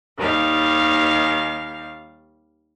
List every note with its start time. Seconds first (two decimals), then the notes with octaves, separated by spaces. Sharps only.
0.18 D#2 D#3 G3 F5